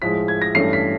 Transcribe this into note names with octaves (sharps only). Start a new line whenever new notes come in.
A2 F3 G#3 B6
G#6
A#6
G2 E3 A3 C#4 C7
B6